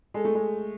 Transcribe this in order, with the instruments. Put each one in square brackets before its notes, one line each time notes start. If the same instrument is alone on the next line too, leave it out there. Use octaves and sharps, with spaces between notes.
[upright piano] G#3 [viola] A4
[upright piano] A3
G#3